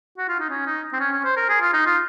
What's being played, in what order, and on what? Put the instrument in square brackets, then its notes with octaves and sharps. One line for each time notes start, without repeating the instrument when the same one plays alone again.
[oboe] F#4
F4
D#4
C#4
D#4
C4
C#4
C#4
C5
A#4
G#4
F4
D#4
F4